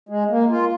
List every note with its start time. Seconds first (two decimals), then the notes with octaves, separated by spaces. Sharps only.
0.09 G#3
0.30 A#3
0.50 F4